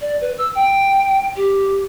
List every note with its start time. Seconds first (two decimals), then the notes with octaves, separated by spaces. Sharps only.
0.01 D5
0.21 B4
0.38 E6
0.55 G5
1.36 G4